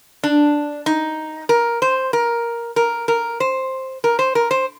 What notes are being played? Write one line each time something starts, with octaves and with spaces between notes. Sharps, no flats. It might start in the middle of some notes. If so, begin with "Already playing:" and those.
D4
D#4
A#4
C5
A#4
A#4
A#4
C5
A#4
C5
A#4
C5